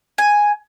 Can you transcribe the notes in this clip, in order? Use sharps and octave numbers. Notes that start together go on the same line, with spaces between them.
G#5